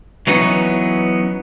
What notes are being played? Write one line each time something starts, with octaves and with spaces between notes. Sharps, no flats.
E3 F#3 B3 C#4 D#4